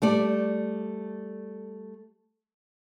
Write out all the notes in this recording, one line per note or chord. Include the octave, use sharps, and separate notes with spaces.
G3 A3 D5